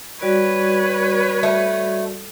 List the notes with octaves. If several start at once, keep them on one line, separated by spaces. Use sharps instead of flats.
G3 F#4 B4 C#5 D5
A3